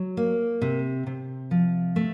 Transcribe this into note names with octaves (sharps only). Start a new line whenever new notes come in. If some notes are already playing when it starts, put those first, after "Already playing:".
Already playing: F#3
A#3
C3
C3
F3
A3